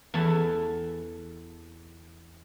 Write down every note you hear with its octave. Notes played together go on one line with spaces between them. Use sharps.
E2 E3 A4 A5